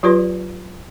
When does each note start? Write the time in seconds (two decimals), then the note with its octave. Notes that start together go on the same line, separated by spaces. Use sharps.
0.03 F#3 F4 G4 B4 D5 C6